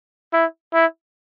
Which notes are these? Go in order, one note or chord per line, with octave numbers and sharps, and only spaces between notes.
E4
E4